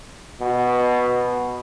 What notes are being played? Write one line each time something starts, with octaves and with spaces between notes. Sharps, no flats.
B2